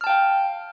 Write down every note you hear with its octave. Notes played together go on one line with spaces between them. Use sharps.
F5 G5 A5 F6